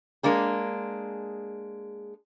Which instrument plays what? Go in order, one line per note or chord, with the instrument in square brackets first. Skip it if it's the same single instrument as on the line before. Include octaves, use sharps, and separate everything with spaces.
[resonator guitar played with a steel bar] G#3 A#3 D4 G#4